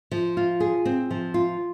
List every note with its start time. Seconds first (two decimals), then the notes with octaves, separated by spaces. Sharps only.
0.11 F3
0.37 F4
0.60 G#4
0.85 C4
1.11 F3
1.34 F4